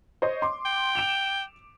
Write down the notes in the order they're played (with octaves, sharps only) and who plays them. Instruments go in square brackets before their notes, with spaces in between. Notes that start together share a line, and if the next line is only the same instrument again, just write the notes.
[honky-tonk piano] C5 C#5 D#5
C6 D6
[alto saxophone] G5
[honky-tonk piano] D7 E7 F7